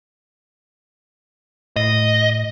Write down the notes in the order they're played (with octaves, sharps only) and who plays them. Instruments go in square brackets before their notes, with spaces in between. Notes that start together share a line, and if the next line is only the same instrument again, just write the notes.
[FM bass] A2 [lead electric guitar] D#5